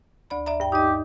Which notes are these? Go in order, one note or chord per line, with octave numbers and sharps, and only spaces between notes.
D2 D5 B5
D5 E5 A#5
G2 G5
D#4 G4 D#5